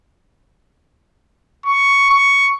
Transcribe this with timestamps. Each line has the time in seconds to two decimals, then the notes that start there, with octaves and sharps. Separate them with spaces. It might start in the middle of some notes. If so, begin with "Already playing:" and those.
1.66 C#6
2.10 C#6